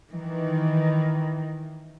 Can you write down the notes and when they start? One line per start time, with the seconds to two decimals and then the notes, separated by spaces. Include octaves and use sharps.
0.12 D#3 E3